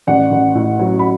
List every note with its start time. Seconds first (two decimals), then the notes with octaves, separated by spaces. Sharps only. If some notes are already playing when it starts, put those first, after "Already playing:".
0.07 A1 D5 F#5
0.31 A1
0.55 A2
0.79 F#3
0.99 B5